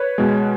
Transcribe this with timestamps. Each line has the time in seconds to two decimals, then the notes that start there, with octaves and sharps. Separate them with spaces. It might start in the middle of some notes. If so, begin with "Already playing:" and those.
Already playing: B4 C#5
0.18 B2 G#3